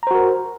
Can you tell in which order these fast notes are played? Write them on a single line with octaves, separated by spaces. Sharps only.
A#5 C5 F#4 A#4